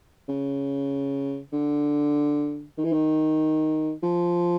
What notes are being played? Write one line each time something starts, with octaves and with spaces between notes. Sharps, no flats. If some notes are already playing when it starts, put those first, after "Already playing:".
C#3
D3
D#3
E3
D#3
F3